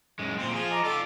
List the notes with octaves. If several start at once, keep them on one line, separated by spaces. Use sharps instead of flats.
F#2 G#3
A#2 C4 C5
F3 F4 G#4 F5
D#5 A#5 D6
F4 G4 A4 D5